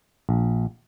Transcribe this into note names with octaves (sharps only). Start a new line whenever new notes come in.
A#1